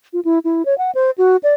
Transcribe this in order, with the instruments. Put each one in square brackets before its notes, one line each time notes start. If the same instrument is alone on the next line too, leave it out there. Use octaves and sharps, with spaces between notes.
[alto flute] F4
E4
E4
C#5
F#5
C5
F#4
D5